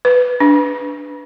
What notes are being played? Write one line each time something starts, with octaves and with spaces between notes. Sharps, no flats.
B4
D4